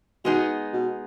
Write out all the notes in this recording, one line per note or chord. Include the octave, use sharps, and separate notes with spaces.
B2 G#3 B3 D#4 G#4
B2